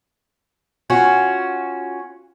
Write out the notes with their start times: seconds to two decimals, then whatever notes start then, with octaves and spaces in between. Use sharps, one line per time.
0.90 C#4 F4 F#4